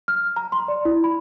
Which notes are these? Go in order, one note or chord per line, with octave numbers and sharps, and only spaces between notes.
F6
A#5
C6
D5
E4
B5